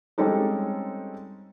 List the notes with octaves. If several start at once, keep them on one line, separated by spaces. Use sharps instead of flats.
G3 G#3 C4 C#4 D#4 A4